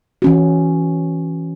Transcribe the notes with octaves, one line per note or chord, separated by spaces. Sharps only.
E3 C#4 F#4